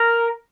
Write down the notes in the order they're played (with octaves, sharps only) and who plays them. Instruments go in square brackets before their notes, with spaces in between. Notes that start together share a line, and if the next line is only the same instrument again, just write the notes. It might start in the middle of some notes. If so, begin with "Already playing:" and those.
Already playing: [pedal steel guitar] A#4